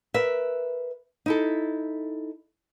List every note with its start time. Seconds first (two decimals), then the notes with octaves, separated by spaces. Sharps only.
0.14 A#4 B4 E5
1.26 D#4 E4 A4